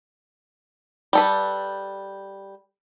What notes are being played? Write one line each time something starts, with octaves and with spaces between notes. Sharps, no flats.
G3 A4 B4